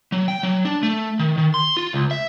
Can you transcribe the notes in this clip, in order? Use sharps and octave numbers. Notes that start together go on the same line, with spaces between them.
F#3
G5
F#3
D4
A3
D#3
D#3
C6
F4
C#2
E5